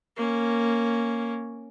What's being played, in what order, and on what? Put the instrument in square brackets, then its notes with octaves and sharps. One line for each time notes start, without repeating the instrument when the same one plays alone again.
[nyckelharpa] A#3 C#4